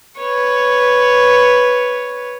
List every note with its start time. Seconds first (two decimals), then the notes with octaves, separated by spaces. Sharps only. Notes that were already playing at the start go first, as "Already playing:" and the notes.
0.20 B4 C#5